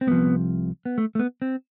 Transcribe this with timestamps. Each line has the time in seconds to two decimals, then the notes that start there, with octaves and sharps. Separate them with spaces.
0.01 C4
0.07 C2 C3 F3 B3
0.85 B3
0.98 A3
1.15 A3
1.19 B3
1.42 C4